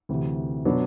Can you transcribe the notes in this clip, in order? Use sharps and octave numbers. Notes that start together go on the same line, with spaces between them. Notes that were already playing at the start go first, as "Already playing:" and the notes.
D2 C3 E3
B2 F#3 B3 D4